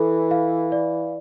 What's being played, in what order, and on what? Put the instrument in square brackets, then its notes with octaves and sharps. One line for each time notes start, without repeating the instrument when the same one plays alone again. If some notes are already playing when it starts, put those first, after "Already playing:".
Already playing: [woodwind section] E3 [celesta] A4
[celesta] F5
D5